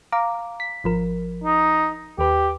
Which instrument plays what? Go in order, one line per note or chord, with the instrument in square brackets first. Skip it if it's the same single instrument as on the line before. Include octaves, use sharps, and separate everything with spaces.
[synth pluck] F5 A#5 D6
B6
G#1 F3 A#4
[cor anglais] D#4
[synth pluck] D#2 B4 [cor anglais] G4